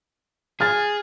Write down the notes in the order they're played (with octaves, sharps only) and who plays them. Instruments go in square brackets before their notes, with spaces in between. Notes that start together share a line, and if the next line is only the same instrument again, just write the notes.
[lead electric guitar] G#4 [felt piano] F6 A6